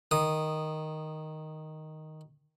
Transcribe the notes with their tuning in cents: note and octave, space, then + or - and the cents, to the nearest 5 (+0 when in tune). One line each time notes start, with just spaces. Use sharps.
D#3 +0 D#6 -15